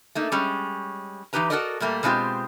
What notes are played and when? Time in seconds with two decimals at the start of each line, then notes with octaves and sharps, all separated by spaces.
0.15 A3 A#3 D#4
0.32 G3 G#3 C#4
1.33 E3 F3 D#4 G4 B4 A#5
1.50 F#4 G4 A4 A#4 D5 D#5
1.80 A#2 G3 A3 A#3
2.03 B2 G#3 C4 F4 G4